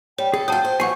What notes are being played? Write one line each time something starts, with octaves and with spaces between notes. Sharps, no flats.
G3 C#5 G5
G#4 A4
F#3 F4 A5 D#6 G6
C5
E3 F#3 F#5 G#5 C#6 C7